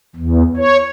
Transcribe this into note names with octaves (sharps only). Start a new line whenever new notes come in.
E2
C#5